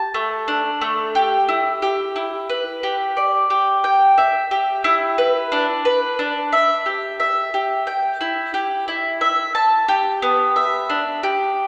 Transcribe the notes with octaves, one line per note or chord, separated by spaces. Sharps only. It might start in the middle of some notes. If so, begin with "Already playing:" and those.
Already playing: G4 A5
A3
D4
A3
G4
E4
G4
E4
B4
G4
D5
G4
G5
E5
G4
E4
B4
D4
B4
D4
E5
G4
E5
G4
G5
E4
G4
E4
E5
A5
G4
B3
E5
D4
G4